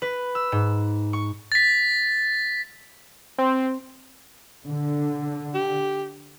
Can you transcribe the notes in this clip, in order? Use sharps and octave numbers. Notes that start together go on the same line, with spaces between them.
B4
E6
G#2
C#6
A6 B6
C4
D3
G4